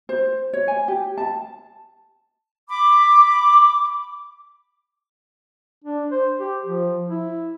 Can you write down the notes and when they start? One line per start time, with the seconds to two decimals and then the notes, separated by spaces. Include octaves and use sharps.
0.09 C5
0.53 C#5
0.68 G#5
0.88 G4
1.18 A5
2.69 B5 D6
5.84 D4
6.11 C5
6.39 G4
6.65 F3
7.09 E4